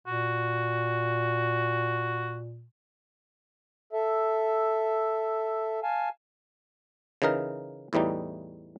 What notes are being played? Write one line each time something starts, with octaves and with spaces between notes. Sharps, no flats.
A#2 F#4
A4 E5
F5 G#5 A5
C#3 E3 D#4 A#4
E2 A2 E3 G3 D#4